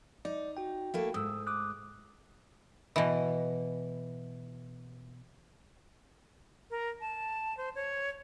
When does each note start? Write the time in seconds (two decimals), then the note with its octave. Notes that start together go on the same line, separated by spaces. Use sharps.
0.25 D#4 D5
0.57 F#4 G5
0.94 A3 A#3 E4
1.14 G#2 D#6 E6
1.47 D6 D#6 F#6
2.96 B2 E3
6.70 A#4
7.01 A5
7.57 C5
7.75 C#5